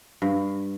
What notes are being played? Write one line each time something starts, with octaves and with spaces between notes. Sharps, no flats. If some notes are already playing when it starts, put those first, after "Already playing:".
G2